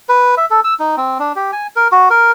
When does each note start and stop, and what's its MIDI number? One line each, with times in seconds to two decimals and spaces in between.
0.09 0.35 71
0.37 0.45 76
0.51 0.60 69
0.64 0.74 88
0.80 0.96 63
0.97 1.18 60
1.19 1.32 62
1.36 1.51 67
1.53 1.67 80
1.76 1.88 70
1.92 2.09 66
2.10 2.32 70